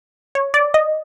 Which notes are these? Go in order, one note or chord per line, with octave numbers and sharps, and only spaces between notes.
C#5
D5
D#5